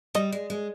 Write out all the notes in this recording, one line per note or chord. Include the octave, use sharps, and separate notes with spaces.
G3 D#5
G#3
G#3